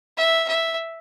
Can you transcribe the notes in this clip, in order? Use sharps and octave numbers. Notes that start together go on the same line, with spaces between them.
E5
E5